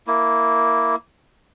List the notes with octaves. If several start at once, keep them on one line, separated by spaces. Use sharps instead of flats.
A#3 E4